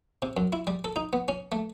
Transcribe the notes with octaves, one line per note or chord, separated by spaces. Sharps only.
C3
F#2
E4
G3
A4
D#4
B3
C#4
A3